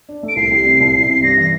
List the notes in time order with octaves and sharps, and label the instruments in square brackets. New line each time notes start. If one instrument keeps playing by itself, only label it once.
[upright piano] D4
A3
[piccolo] D7
[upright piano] C2 [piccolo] C7
[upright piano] G3
C3
C2
C2
C3
[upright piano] G2 [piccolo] A#6
[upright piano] E3